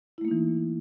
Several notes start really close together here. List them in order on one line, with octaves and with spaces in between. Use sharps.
E4 A3 A#3 D#4 E3